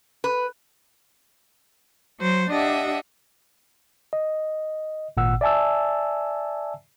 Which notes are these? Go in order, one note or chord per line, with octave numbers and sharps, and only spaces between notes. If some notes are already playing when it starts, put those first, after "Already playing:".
B4
F#3 C5
D4 G4 D#5 E5 F#5
D#5
G#1 A#2 F#5 E6
D5 E5 G#5 A5 E6